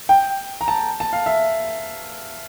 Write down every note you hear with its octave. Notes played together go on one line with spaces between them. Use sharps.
G5
A#5
A5
A5
F5
E5